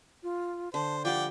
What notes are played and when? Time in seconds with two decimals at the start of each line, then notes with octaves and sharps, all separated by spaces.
0.23 F4
0.74 D3 C5 A5
1.05 F3 G3 D5 F#5 G5